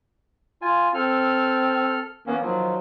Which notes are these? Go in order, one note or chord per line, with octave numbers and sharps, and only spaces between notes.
F4 G#5
C4 A4 F6
E3 A#3 B3 C#4
D#3 F3 F#3